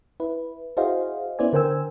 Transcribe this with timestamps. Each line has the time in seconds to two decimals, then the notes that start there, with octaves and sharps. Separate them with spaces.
0.20 E4 B4
0.77 E4 F#4 G#4 C5 D#5 F5
1.39 B3 C#4 E4 C5 D5 G#5
1.53 D3 A#4 C5 G5 G#5 E6